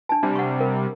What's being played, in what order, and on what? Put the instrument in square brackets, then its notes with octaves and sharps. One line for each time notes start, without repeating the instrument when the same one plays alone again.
[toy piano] D4 A5
[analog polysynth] C3 G3 [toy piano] D4
[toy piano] F#5 C#6
A#4